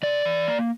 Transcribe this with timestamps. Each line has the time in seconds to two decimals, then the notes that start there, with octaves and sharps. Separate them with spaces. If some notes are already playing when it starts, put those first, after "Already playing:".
0.03 C3 D5
0.25 E3
0.48 A#3